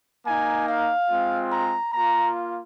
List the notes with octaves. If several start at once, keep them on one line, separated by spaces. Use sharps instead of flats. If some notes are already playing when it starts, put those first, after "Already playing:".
A#3 D#4 G#5
F5
G#3 C4 F4
A#5
A#3 F4 A#5